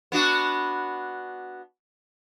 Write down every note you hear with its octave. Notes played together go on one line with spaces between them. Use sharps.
B3 D4 F#4